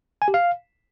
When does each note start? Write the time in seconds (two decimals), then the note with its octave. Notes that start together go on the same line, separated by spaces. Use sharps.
0.22 G#5
0.28 G4
0.34 F5